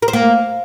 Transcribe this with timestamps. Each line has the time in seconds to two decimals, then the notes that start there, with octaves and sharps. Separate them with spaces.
0.02 A#4
0.08 C5
0.13 A#3